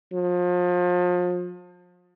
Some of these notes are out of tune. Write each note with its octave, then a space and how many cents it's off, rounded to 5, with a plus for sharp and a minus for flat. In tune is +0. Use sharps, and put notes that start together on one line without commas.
F3 +35